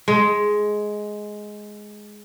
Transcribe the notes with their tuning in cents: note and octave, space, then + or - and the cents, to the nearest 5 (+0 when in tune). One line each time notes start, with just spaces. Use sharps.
G#3 +10